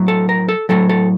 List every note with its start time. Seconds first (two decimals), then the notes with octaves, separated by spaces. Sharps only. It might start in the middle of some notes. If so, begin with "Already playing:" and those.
Already playing: A2 F#3
0.08 A4
0.29 A#4
0.49 A4
0.69 A2 F#3 A4
0.90 A4